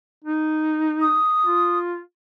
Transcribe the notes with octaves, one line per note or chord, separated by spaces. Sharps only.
D#4
D#6
F4